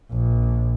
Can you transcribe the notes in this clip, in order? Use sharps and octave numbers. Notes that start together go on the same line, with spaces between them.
A#1